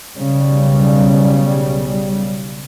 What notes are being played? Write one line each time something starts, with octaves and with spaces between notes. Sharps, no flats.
B1 C#3 G3